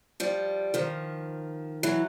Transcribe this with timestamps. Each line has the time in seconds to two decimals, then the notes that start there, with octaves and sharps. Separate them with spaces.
0.20 F3 G3
0.74 D#3 F3
1.83 E3 F#3